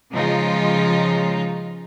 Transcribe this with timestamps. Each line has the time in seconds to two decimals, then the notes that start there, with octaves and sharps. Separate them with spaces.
0.13 C#3 F3 G#3 D#4 F4